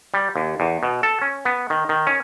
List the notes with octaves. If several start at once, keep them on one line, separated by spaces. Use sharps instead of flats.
G3
D#2
E2
B2
A4
C#4
B3
D#3
D#3
C#4